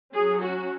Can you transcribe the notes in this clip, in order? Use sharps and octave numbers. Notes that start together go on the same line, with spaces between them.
F#3 C#4 G#4
F#4